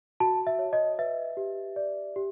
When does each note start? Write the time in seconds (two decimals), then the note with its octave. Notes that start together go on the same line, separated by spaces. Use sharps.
0.20 F#4 A5
0.47 E5
0.59 C#5
0.73 D#5
0.99 B4 E5
1.37 G4
1.76 D5
2.16 G4